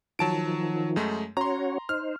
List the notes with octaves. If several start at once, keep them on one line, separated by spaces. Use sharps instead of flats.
D#3 F3 F#3 A5 D7
F#2 G#3 A3
C#4 F#4 C#5 A#5 C6
D#4 C5 F6